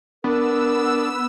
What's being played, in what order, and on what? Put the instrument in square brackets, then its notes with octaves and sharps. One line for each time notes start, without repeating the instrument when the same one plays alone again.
[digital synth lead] B3 [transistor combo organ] D4 [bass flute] A#4 [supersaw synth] E6